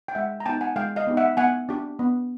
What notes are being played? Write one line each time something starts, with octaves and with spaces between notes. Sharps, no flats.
G5
G#3 E5 F#5
A#5
B3 D#4 G4 G5 A5
F#5 G#5
G#3 F5 G5
D#5 F5
B3 D#4 G4
E5 F#5
B3 F#5 G#5
D4 G4
B3